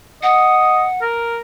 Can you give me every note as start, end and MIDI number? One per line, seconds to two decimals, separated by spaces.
0.23 0.85 75
0.23 1.00 78
1.01 1.38 70